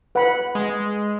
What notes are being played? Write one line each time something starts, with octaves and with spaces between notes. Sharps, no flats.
B4 F#5 B5
G#3